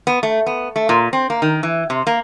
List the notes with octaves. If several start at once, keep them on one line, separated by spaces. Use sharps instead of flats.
B3
A3
B3
A3
A#2
C4
A#3
D#3
E3
C3
A#3